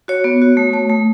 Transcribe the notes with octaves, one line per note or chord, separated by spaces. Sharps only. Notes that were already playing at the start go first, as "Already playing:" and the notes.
F#4 C#5
B3
F#4
A3
A3
A3